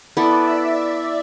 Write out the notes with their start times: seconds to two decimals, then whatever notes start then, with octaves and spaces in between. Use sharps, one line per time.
0.17 B3 E4 A4 D5
0.46 E5
0.73 E5